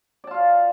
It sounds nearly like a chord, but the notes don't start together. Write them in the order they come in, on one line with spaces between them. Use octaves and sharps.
D5 A5 F4 F5